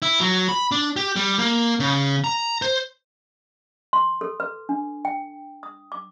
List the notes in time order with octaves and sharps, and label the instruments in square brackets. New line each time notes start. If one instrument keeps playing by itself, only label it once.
[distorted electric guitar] E4
F#3
B5
D4
G4
G3
A#3
C#3
A#5
C5
[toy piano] C6
A4
B4
D4
G5
D#6
D6